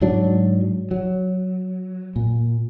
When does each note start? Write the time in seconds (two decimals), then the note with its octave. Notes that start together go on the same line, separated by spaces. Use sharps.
0.01 G#2 F#3 D4
0.91 F#3
2.16 A#2